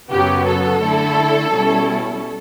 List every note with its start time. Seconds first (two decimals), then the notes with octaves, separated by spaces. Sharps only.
0.10 F#2 C#3 F#3 B3 G4
0.46 A4
0.81 D3 A3 E4
1.51 B2 G3 C#4 E4